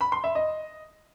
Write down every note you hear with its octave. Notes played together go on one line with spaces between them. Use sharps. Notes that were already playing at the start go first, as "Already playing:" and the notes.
B5
C6
E5
D#5